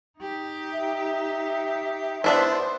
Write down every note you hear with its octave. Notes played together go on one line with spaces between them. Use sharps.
D#4 G4
E5
B3 D4 E4 C5